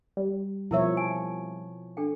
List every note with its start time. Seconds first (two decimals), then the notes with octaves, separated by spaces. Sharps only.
0.17 G3
0.71 B2 F3 E4 A#4 C#5 E5
0.97 G#5 A5
1.97 D4 A4 G5